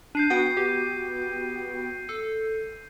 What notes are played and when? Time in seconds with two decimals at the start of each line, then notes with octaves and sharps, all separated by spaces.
0.15 D4 G6 C7 D#7
0.30 B3 F#4 F#5 G5
0.57 G4
2.09 A4